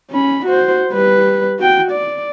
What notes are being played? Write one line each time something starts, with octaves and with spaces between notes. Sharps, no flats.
C#4 B5
F#4 C5
G3 B4
F#4 G5
D5